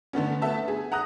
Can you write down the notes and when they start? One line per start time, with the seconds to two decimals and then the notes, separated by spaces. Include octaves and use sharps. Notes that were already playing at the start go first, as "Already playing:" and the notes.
0.13 D3 A3 B3 C#4
0.42 A3 B3 E5 A5
0.68 G#4
0.92 F#5 A#5 D#6 F#6 A#6